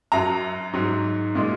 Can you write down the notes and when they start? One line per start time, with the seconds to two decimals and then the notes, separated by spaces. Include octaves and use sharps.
0.12 F#2 F#3 A#5
0.74 G#2 F#3
1.35 A#2 G#3